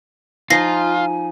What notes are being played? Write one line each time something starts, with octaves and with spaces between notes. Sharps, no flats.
F3 D#4 F4 G#5 A#6 C7